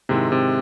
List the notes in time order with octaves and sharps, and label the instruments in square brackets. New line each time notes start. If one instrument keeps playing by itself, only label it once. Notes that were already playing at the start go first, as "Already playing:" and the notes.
[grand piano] G#2 D#3 G#3 C4 E4 [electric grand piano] C3
[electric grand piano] C3